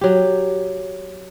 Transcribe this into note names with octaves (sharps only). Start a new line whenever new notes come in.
F#3 G4